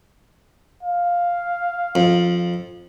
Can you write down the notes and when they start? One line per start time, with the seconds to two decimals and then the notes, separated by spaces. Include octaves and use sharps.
0.83 F5
1.95 F2